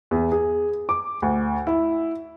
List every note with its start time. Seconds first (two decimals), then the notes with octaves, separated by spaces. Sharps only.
0.11 E2
0.32 G#4
0.89 D6
1.22 D2
1.67 E4